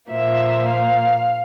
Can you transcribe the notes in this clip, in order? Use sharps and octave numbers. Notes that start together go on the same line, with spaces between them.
A#2 F3 A#3 E5
F5